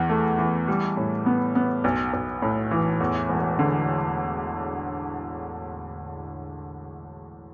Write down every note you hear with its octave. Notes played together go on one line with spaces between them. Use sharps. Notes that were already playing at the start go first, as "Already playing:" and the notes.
Already playing: E2 E3
A3
E3
G3
A2
B3
B3
B1
B1
A2
E3
E2
E1
D3